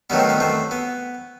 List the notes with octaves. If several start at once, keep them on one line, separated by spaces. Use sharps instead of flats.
G2 D#3 F#3 A3 B3
C4
B3
A3 C4
B3